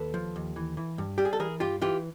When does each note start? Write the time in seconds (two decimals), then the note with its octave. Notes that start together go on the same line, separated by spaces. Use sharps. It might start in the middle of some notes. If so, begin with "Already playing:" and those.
Already playing: D#2 A4 B4
0.14 F3
0.36 D#2
0.56 E3
0.77 E3
0.98 G2
1.18 G3 G4
1.25 G#4
1.33 A4
1.40 E3 G#4 A#4
1.60 G2 F4 G4
1.82 E3 F4 G4